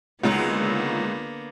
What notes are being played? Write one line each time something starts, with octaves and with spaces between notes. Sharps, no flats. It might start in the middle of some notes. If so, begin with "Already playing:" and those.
C#2 D3 F#3 A#3 B3 D#4 F4